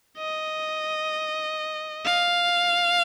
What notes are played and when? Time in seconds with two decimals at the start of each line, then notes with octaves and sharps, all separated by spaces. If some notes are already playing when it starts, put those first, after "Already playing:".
0.18 D#5
2.05 F5